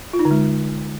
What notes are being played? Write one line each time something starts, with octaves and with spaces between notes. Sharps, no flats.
F4
D#4
D3
G#3